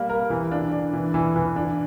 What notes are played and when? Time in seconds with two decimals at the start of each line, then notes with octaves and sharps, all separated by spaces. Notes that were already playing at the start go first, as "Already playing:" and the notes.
Already playing: G3 A#3
0.09 A#4
0.30 E3
0.51 D4
0.72 D4
0.93 E3
1.14 E3
1.36 E3
1.56 D4